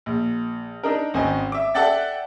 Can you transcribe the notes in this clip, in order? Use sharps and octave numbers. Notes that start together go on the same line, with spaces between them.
A#1
D4 D#4 A#4
G#1 C4 C#4 D#5 G#5
E5 D6
A4 D5 E5 F#5 G5 A6